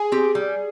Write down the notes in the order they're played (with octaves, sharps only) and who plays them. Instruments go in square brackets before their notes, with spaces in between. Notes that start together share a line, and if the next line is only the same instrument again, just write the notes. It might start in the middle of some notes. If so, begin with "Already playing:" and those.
Already playing: [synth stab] G#4
[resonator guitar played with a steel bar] C4 G4
G3